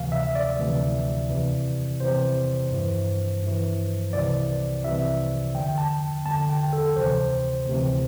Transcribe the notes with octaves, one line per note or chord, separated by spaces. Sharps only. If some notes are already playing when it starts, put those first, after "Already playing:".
Already playing: D2 C3 E3 F5
E5
D5
D2 C3 E3
E2 C3 E3
E2 C3 E3 C5
G2 E3
G2 E3
C2 C3 E3 D5
C2 C3 E3 E5
E2 D3 G5
A5
E2 D3 A5
G5
A4
D2 C3 E3 C5
D2 C3 E3